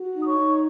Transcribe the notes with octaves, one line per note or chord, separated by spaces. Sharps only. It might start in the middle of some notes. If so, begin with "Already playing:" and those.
Already playing: F#4
D#4
D#6
C#5 C#6
D#4